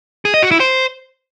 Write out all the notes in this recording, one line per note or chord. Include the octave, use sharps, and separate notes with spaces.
G#4
D#5
F#4
E4
C5